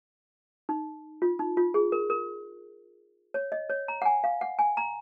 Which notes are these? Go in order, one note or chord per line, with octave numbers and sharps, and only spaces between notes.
D#4
F4
D#4
F4
G#4
A#4
A#4
C#5
D#5
C#5
A#5
F#5
G#5
F5
F#5
G#5
A#5